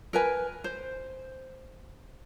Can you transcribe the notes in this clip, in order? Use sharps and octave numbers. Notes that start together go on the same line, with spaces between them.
A#4 B4 G#5
C5